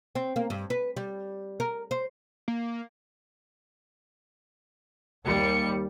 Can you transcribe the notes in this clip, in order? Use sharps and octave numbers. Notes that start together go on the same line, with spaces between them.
C4
A#3
G2
B4
G3
A#4
C5
A#3
D#2 G3 C#7